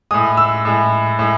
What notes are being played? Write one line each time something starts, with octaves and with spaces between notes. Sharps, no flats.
A2 G#3 D#6
E6
A2 G#3
A2 G#3